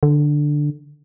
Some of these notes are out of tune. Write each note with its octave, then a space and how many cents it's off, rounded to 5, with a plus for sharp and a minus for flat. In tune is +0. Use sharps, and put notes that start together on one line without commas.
D3 +5